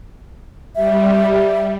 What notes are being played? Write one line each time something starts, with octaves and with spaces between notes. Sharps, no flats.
G3 E5